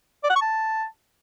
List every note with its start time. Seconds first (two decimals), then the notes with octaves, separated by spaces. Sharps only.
0.24 D5
0.30 F#5
0.36 C#6
0.42 A5